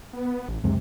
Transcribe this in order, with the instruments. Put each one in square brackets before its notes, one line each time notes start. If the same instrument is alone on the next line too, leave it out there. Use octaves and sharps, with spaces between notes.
[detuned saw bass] B3
A1
[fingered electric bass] C#2 F#2 G#3 [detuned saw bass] C3